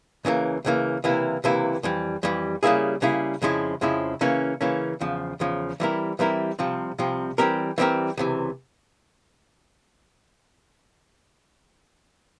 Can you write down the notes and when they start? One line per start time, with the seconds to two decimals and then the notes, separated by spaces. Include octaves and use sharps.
0.25 C#2 C#3 E3 A#3
0.65 C#2 C#3 E3 A#3
1.04 C#2 C3 E3 A#3 E4
1.44 C#2 C3 E3 A#3 E4
1.83 F2 E3 G3
2.23 F2 E3 G3
2.63 C#3 G3 A#3 E4 G#4
3.02 C#3 G3 A#3 E4 G#4
3.42 F2 C#3 F3 G#3 E4
3.81 F2 C#3 F3 G#3 E4
4.21 C#3 E3 A#3 C#4
4.61 C#3 E3 A#3 C#4
5.00 E2 C#3 F3
5.40 E2 C#3 F3
5.80 E3 G3 C4 E4 A#4
6.19 E3 G3 C4 E4 A#4
6.59 C2 C3 F3 C4
6.99 C2 C3 F3 C4
7.38 E3 G3 C4 G4 A#4
7.78 E3 G3 C4 G4 A#4
8.17 C#2 C3 E3